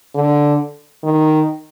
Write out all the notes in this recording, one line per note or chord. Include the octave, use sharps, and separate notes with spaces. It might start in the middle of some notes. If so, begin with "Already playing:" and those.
D3
D#3